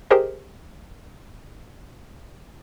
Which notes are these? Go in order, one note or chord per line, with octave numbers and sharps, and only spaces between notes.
G4 G#4 A#4 C5 D#5